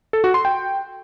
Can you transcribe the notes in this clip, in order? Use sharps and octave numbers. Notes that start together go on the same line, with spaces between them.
A4
F#4
C6
G5